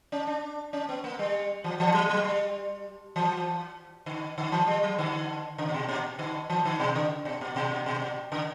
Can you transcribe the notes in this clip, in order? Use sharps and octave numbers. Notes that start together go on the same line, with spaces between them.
C#4
D4
C#4
B3
A#3
G3
E3
E3
F#3
F#3
G3
E3
D3
D3
E3
G3
F#3
D3
C#3
A#2
B2
A#2
D3
E3
D3
B2
C#3
B2
A#2
B2
A#2
B2
A#2
C#3